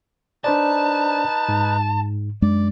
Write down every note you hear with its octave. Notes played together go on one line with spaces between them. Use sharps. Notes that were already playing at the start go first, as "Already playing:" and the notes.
D4 D#4 B4 C5 D5 A5
G#2
F#2 G#3 D4 D5